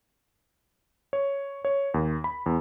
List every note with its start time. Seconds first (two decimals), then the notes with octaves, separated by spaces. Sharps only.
1.13 C#5
1.65 C#5
1.94 D#2
2.24 B5
2.46 E2